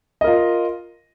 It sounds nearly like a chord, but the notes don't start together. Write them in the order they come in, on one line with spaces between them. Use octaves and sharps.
D#5 A#4 F4